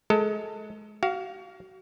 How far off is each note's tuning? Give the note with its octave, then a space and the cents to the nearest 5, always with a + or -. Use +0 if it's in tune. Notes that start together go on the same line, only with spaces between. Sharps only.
G#3 +30 A4 +25
F#4 +30 F5 +0